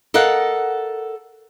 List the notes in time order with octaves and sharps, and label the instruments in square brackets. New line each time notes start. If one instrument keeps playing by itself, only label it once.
[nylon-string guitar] A4 A#4 D#5 F5 F#5